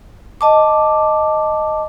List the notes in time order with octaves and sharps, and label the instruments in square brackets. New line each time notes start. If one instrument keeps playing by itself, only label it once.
[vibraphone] D#5 A5 D6